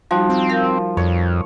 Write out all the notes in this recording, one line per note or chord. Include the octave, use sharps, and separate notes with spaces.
F3 G3 D#4 F#4
C4
A#4 F5
F2 C#5